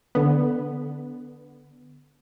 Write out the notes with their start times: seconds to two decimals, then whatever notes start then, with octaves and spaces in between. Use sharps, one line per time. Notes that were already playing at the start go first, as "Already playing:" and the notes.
0.15 D3 B3